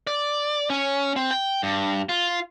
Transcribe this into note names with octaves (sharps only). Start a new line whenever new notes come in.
D5
C#4
C4
G5
G2
F4